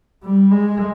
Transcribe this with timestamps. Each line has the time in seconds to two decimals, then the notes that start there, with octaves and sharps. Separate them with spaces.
0.24 G3
0.51 G#3